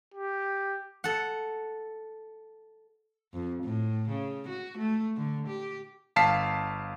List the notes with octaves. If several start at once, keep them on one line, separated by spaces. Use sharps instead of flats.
G4
A4 F#5
F2
A2
C#3
F#4
A3
D3
G4
G1 F5 A5 B6 C7